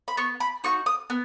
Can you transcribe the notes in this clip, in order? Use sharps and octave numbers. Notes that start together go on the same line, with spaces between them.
B5
B3 C#6
B5
D#4 F#4 C#6
D#6
B3